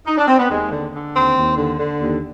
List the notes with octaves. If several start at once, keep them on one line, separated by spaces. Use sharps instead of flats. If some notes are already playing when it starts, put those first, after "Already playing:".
D#4
D4
C4
B3
D#2 G#3
D3
D3
D#2 C4
D#2
D3
D3
D#2